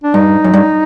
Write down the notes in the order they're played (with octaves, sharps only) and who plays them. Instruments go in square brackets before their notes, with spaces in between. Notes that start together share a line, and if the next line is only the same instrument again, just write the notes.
[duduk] D4
[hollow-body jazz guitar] G2 [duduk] D#4
[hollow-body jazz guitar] F#2
G2